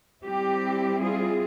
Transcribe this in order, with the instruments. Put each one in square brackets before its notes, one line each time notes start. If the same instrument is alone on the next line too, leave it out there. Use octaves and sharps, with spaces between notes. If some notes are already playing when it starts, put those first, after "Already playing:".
[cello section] G3 C4 E4 G4
F4 G#4